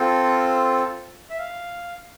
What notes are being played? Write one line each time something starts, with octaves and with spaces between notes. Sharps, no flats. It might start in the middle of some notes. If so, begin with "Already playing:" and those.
Already playing: C4 F4 A4
E5
F5